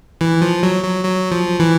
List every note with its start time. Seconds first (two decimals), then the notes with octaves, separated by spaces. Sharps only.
0.21 E3
0.42 F3
0.63 F#3
0.83 F#3
1.05 F#3
1.32 F3
1.60 E3